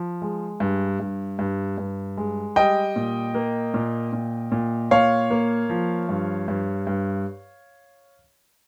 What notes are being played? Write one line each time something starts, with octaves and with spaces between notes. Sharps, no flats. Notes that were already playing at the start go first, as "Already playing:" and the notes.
Already playing: F3
G#3
G2
G2
G2
G2
G#3
G3 D#5 G5
A#2
A#3
A#2
A#2
A#2
A#2 C#5 F5
A#3
F3
G2
G2
G2